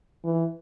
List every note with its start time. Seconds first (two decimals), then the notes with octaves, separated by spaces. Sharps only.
0.24 E3